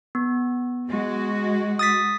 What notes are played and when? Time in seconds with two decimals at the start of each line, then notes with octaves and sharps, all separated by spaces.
0.15 B3
0.89 G#3 F#4
1.79 D#6 A6 B6